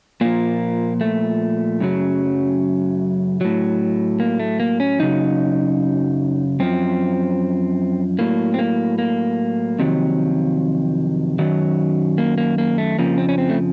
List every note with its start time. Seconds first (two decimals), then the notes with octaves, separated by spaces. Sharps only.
0.21 A#2 F3 A#3
1.01 A3
1.80 F#2 C#3 F#3
3.41 A2 F#3
4.20 A#3
4.40 A3
4.60 A#3
4.80 C#4
4.99 F#2 C#3 F#3 D#4
6.60 F#2 F3 C4
8.19 A2 F#3 A#3
8.54 C4
8.59 A#3
8.98 A#3
9.79 F2 C3 D#3 F#3
11.39 F#2 D#3 F#3
12.18 A#3
12.38 A#3
12.58 A#3
12.78 A3
12.98 F2 C#3 F3 A#3
13.18 C4
13.29 C#4
13.38 C4
13.49 A3